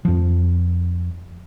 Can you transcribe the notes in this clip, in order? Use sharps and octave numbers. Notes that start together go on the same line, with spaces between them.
F2 F3